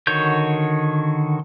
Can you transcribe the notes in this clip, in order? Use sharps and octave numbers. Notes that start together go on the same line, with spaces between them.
D3 D#3 F#4 C#5 G6